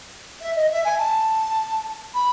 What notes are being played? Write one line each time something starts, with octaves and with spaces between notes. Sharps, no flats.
E5
D#5
E5
G#5
A5
B5